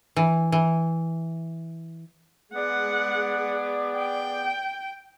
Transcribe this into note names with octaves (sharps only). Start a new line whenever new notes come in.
E3
E3
G#3 B3 G#4 D5 F#5
G5